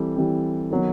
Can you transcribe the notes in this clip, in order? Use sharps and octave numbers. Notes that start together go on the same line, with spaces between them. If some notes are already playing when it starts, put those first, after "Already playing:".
Already playing: E3 G3 C4 A4
E3 G3 C4
D#3 F#3 B3